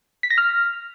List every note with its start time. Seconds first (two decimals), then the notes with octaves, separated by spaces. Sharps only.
0.23 B6
0.30 A#6
0.38 F6